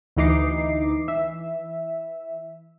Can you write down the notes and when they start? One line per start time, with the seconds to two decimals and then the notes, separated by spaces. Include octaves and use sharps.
0.17 D2 E3 D#4 D6 C7
1.08 E3 E5